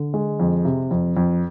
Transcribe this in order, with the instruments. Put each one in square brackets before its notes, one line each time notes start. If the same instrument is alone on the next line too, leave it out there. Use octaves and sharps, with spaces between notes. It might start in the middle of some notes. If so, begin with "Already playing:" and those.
Already playing: [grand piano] D3
G#3
F2
C3
F2
F2